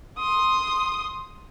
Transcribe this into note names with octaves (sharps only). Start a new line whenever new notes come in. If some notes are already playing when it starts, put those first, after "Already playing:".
C6 D#6